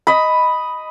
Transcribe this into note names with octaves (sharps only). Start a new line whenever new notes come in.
D#5 B5